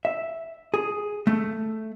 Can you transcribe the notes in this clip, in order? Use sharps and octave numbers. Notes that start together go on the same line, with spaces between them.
E5
G#4
A3